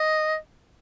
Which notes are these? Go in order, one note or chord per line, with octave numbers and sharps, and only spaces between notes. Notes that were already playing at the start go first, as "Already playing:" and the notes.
Already playing: D#5